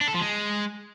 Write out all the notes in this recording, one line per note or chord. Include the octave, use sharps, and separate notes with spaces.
D4
A4
F3
G#3